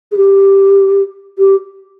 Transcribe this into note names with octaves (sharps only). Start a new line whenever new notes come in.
G#4
G4
G4